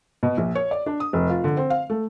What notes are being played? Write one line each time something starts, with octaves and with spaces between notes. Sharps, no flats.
B2
A#1
C#5
D5
D4
D#6
F1
F4
D3
C4
F5
A3